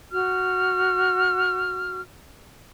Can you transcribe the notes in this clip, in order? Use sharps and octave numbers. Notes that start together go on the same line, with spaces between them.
F#4 F6